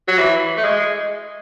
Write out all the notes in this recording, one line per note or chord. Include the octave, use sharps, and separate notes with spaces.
F#3
E3
A3
G#3